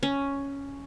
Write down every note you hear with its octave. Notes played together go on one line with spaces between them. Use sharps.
C#4